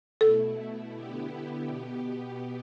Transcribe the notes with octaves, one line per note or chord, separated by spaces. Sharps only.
B2 A3 E4 A4
D3 B3 E4 G4
B2 B3 G4